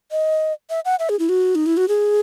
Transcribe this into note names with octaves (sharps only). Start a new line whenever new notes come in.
D#5
E5
F#5
E5
G#4
E4
F#4
D#4
E4
F#4
G#4